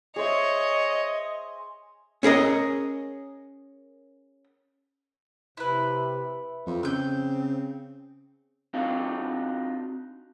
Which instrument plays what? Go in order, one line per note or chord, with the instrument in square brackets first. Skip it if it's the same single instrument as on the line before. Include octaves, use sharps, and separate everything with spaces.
[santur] G#4 C5 E5 [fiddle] C#5 [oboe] D#5
[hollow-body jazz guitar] C#4 G#4 A#4 D#5
[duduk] C3 [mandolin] E4 B4
[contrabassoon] F2 [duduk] C4
[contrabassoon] C#3 [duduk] C4 [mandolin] E6 G6
[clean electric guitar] C4 D4 D#4 F4 F#4 F5